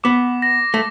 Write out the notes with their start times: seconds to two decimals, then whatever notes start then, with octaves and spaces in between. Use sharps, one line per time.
0.04 B3 D6
0.42 A#6
0.74 A3